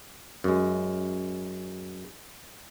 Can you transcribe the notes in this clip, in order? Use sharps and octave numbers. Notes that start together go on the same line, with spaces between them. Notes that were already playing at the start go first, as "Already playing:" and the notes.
F#2 G#3